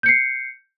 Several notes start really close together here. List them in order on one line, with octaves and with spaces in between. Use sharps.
G6 C#7 C7